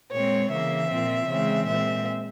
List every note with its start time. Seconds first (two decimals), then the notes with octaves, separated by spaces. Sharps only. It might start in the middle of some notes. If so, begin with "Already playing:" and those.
0.12 A#2 G#3 C4 C#5
0.50 C#3 E3 A#3 E5
0.89 A#2 F3 C4
1.28 C#3 E3 G#3 C4
1.67 A#2 G#3 C4 E5